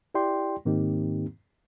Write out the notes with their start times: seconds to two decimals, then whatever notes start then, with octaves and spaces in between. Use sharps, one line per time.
0.15 E4 G4 D5 G5 C6
0.65 G#2 D#3 A#3 C4 D#4 G4